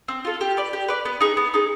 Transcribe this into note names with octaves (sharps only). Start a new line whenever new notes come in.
C4
F4 A4
G4
B4 D5
G4
B4 D5
B3
D#4 G#4
B3
D#4 G#4